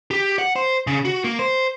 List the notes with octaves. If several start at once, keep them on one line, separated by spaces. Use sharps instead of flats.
G4
F#5
C5
C#3
F#4
A#3
C5